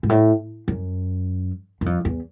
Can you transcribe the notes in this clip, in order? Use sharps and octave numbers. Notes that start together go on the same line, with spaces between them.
G#2
A2
F#2
F#2
F2
E2